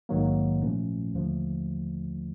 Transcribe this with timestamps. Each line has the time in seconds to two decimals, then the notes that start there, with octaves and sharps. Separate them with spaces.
0.09 A#1 G#2 D#3 F#3 A#3
0.62 A#2 F3 A3 C#4
1.14 D#2 D3 F3 A3